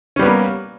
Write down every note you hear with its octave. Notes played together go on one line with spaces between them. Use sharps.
G3 A#3 B3 C#4